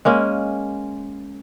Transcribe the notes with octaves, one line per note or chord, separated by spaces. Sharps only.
G#3 A#3 C#4